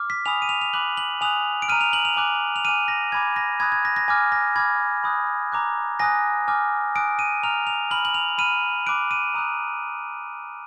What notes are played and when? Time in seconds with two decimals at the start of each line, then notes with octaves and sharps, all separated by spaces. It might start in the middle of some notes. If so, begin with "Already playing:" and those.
Already playing: D6 F6
0.10 B6
0.26 G#5 B5 D#6 F7
0.42 D#7
0.49 F7
0.61 F7
0.73 B5 D6 F#6 F#7
0.97 F#7
1.21 G#5 D#6 F#6 F7
1.62 D7
1.69 A#5 F6 D#7
1.81 F7
1.93 F#7
2.05 F7
2.17 G#5 D6 F#6
2.56 F7
2.65 G#5 D6 F6 D#7
2.88 A#6
3.12 G#5 B5 D6 G#6
3.36 A#6
3.60 B5 D#6 F#6 G#6
3.72 G#6
3.85 A#6
3.96 A#6
4.08 G#5 D6 F6 G#6
4.32 A#6
4.56 B5 D6 F6 G#6
5.04 B5 D#6 F#6
5.52 A#5 D6 F#6
5.99 G#5 D#6 F#6 A#6
6.48 G#5 D6 F6
6.95 G#5 D#6 F#6 D7
7.19 D#7
7.43 A#5 F6 F7
7.67 F7
7.91 B5 F6 F#7
8.05 F#7
8.14 F7
8.38 B5 F6 D#7
8.87 B5 D6 F#6 D7
9.11 D#7
9.34 A#5 D#6 F#6